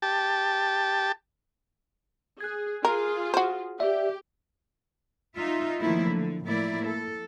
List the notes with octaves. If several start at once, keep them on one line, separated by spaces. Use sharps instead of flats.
G4 A5
G#4 F#6 G#6
F4 G#4 A#4
F#4 C5
G4 D5 E5
D#4 F4 E5
D#3 F3 F#3 A3 A#3 E4
D3
A2 F3 A#3 E4 D5
A4